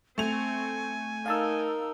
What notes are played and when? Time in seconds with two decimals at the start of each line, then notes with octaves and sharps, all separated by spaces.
0.18 A3 C4 G#5 F7
1.26 D#4 A#4 F5 A5 E6